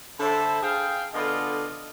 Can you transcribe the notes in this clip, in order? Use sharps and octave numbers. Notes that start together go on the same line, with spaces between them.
D3 A4 C5 E5 A5 B5
G#4 F5 G5
D3 B3 F4 A4 D5 D#5